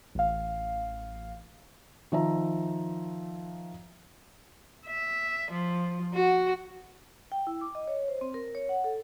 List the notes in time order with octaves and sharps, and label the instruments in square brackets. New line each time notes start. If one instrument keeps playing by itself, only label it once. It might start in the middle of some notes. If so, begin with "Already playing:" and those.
[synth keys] A1 F5
[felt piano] D#3 F3 E5 A#5
[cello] E5
F3
F#4
[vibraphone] G5
E4
D6
D#5
C#5
C5
C4
A#4
C#5
F#5
A4